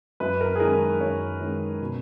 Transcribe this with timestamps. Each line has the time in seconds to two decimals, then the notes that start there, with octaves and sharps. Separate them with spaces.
0.20 F#2 B4
0.41 A#4
0.55 G#4
0.60 D#3 G#3 C#4 A#4
1.01 F#2 C#5
1.40 D#3 G#3 C#4
1.81 B2